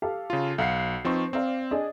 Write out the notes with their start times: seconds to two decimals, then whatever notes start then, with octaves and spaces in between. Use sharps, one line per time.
0.02 G4 A4 F5
0.30 C#3 F4
0.58 B1 F5 F#5 C7 C#7
1.05 F3 C4 D#4 B4 C5 C#6
1.33 C4 D5 F5
1.71 D4 G#4 D#5